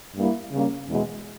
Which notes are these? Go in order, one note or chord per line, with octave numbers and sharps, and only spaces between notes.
G2 G3 A#3 E4
C#3 G3 A#3 C#4
E2 B2 G#3